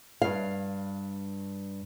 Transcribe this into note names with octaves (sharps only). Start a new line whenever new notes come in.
G2 F5